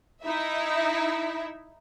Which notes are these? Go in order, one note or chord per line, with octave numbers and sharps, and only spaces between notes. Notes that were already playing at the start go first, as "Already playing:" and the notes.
D#4 E4 E5